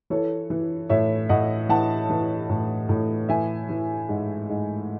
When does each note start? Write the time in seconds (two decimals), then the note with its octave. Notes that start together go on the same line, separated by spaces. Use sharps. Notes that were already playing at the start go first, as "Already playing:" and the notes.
0.10 E3 A4 C#5
0.50 E3
0.89 A2 C#5 E5
1.29 A2 D#5 F#5
1.69 E3 F#5 A5
2.10 E3
2.49 A2
2.89 A2
3.29 E3 E5 G#5
3.69 E3
4.09 G#2
4.49 G#2